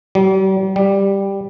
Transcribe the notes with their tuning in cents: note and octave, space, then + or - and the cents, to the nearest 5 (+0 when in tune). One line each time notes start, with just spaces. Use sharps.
G3 -40
G3 +5